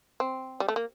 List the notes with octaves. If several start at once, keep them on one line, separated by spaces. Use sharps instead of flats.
C4
G3
A3
A#3